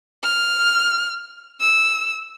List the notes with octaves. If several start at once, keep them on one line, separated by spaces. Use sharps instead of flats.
F6
E6